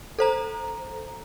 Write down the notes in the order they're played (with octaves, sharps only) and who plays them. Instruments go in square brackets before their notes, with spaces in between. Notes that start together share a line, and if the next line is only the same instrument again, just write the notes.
[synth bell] A4 C5 A#5